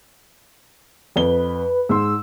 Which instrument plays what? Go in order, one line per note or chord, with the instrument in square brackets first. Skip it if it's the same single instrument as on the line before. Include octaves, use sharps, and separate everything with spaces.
[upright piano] F2 G7 [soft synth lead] B4
[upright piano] G#2 C6 [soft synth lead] E6